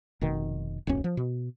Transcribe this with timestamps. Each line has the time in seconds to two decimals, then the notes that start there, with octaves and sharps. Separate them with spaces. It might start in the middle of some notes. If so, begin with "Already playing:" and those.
0.21 F1 B2 D#3
0.87 D1 B1 F#2 C#4
1.04 F3
1.17 B2